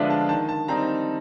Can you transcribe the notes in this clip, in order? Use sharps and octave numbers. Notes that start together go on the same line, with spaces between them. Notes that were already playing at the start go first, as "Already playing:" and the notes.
Already playing: D3 F3 G#3 B3 D4 E5 F5
A5
D#3 A5
A5
G3 C4 D#4 A#5